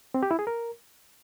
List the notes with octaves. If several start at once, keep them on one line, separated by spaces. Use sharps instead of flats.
C4
G4
E4
G#4
A#4